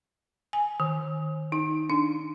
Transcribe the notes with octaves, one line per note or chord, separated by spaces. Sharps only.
G#5
D#3
D#4
D4